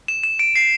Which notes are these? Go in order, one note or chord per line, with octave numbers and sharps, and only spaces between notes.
E7
E7
D7
C7